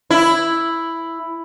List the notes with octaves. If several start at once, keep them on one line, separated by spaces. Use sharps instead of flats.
E4